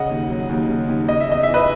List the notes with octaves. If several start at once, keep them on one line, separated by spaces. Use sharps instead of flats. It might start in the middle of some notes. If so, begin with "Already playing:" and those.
Already playing: C#3 D#5 F#5
D#2
F#3
D#2
C#3
D#2
C#3 D#5
E5
E2 D#5
E5
E3
B4 D#5